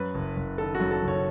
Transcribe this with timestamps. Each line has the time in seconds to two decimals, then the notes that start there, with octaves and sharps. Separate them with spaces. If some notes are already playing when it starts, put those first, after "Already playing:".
Already playing: F#2 B4
0.14 F#1
0.36 F#1
0.58 D#3 A4
0.75 F#4
0.80 F#2
0.91 A4
1.02 F#1
1.08 C#5